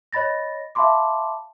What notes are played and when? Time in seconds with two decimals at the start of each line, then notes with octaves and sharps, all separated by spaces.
0.13 C#5 D#5 B5 A6 A#6
0.75 E5 F5 A5 B5 C6 D6